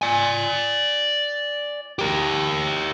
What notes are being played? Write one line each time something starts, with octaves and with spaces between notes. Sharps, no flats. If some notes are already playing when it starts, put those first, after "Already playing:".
D5 G#5
G4 A#4